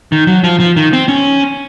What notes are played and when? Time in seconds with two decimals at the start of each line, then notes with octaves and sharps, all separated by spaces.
0.12 D#3
0.27 F#3
0.44 F3
0.60 F3
0.76 D#3
0.93 C4
1.08 C#4